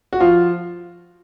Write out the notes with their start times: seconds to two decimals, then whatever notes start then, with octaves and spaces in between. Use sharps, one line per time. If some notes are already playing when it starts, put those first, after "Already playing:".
0.13 F#4
0.20 F3 F4